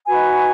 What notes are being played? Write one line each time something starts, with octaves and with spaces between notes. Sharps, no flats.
D#4 F#4 B4 G#5